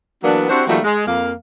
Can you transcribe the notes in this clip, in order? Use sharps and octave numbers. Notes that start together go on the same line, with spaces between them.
E3 F#3 A#3 B3 D4
C4 D4 E4 F#4 G4 C5
D#3 F3 G3 A3 A#3 F#4
G#3
F2 A#3 F5